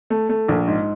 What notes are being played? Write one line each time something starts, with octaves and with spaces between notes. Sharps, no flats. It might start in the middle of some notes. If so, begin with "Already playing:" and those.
A3
A3
A#1
G#2